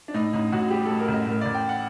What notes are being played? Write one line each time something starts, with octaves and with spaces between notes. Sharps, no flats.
D4
A2 D#4
A1 D#4
A1 F#4
G3 G4
A2 A4
A#4
A1 D#5
A2 A#4
A1 D5
G5
F#5